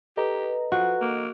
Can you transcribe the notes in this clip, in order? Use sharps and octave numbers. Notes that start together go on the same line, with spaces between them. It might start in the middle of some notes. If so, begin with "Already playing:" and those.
G4 A4 B4 D#5 A#5
F3 F#4
A#3